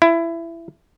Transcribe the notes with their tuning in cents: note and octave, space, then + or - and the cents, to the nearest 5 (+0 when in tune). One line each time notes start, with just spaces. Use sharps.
E4 +20